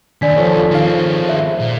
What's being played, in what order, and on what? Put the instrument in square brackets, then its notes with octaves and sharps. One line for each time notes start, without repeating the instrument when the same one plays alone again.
[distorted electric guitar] D#2 [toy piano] D4 D5 [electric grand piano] G#5 B6
[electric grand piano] F3 A4 C#5
[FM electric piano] D#3 F5 [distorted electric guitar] G#3 C4
[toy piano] G#4 C5 E5
[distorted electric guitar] A#2